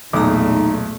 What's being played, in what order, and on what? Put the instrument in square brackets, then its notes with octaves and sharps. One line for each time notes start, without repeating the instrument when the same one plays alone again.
[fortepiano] B1 D6 [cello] E2 A#2 [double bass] A3 [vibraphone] D#4 A#5